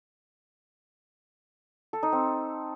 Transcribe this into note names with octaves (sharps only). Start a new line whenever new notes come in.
A4
D#4
C4